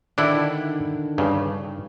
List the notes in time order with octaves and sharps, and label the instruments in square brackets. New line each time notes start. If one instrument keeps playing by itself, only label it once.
[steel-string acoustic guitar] D3 D#3 [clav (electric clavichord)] D4 E4
[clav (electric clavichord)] G2 C#3